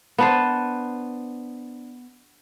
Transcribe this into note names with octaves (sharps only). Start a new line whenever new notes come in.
B3 D4 B4 C5